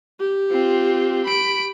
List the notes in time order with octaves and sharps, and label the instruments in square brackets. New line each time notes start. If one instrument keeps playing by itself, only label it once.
[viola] G4
[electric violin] C4 F4
B5 D7